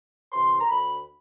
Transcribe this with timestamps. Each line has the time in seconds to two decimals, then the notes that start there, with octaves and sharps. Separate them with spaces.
0.32 C3 E3 C6
0.60 A#5
0.70 D2 B5